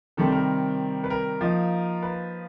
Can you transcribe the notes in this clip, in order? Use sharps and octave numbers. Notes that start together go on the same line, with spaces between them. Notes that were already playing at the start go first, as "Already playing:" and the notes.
C3 D#3 G3 C4 A4
A#4
B4
A#4
F3 A#3 D#4
B4